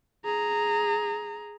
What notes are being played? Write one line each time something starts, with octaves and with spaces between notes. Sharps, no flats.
G#4 A#5